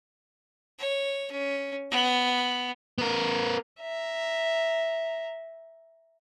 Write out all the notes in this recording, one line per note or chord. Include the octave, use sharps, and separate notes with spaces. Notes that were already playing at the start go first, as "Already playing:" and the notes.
C#5
C#4
B3
B3 A#4
E5 A#5